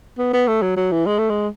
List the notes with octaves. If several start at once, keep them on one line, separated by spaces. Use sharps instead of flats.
B3
B3
A3
F#3
F#3
E3
G#3
A3
G#3